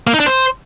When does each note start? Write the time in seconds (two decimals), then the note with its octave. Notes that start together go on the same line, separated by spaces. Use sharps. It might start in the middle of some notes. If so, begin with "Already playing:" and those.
0.07 A#3
0.14 D#4
0.20 D4
0.26 C5